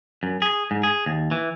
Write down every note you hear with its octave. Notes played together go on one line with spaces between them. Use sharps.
F#2
G#4
G#2
G#4
D#2
E3